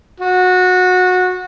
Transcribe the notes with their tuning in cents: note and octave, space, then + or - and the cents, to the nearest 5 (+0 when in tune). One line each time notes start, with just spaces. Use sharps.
F#4 -20